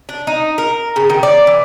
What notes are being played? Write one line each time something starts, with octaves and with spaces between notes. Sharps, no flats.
D4
D#4
A#4
C#3
D#3
D5
E3